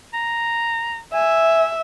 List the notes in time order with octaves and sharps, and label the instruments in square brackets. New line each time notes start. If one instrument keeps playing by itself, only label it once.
[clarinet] A#5
[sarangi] E5 [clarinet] G#5